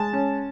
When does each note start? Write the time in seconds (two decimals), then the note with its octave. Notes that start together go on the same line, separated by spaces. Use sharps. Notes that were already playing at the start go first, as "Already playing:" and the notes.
Already playing: G#3 A5
0.13 C#4